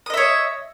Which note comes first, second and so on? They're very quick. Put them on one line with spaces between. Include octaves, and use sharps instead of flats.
D#6 D#5 E5 C#5